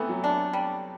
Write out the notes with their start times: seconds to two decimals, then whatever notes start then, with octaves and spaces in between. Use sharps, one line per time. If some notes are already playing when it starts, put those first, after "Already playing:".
Already playing: E3 A3 B3 C4
0.09 F#3
0.24 D4
0.53 G3